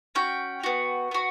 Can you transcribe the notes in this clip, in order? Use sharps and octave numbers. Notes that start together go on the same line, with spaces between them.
C#4 F#4 G5
B3 F#4
B3 F#4